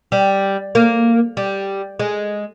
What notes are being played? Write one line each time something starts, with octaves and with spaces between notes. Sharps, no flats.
G3
A#3
G3
G#3